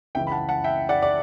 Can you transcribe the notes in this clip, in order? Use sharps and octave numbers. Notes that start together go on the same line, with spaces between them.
C#2 C#3 E3 E5 G5
B5
F#5 A5
F#5 A5
E5 G5
D5 F#5
D5